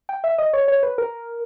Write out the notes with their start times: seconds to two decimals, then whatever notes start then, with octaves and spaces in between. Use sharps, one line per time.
0.09 G5
0.24 E5
0.38 D#5
0.53 C#5
0.68 C#5
0.83 B4
0.98 A#4